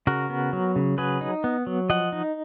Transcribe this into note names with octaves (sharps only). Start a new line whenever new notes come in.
C#3 F#4 A#4
B3
F#3
C#3
F#3 G#4 B4
D#4
B3
F#3
F3 D#5 F#5
D#4